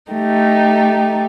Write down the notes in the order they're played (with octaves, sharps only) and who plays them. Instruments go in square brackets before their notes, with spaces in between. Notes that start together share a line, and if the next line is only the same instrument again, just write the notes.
[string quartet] A3 D#4 G4